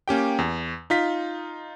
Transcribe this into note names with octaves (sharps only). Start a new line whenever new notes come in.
A#3 C#4 G4 G5
E2
D#4 F4 B6